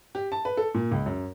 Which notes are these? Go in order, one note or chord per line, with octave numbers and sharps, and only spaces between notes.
G4
A5
B4
A4
A#2
C#2
F#2